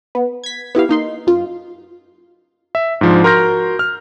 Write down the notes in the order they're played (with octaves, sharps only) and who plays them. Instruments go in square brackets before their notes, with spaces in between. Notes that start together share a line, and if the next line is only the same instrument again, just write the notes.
[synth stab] B3
G#6 B6
B3 E4 G4 F5
A#3 D#4 C6
F#2 F4
[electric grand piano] E5
G#2 F3 D4
F#4 A#4 C6 F6 G6 A#6
F6